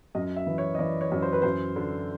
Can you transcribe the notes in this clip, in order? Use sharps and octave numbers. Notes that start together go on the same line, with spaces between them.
F#2 D#5
E5
E3
C#5
D#5
E3 D5
C#5
F#2
C5
B4
F#2 C5
D3